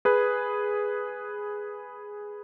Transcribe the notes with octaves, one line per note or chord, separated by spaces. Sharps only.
G#4 B4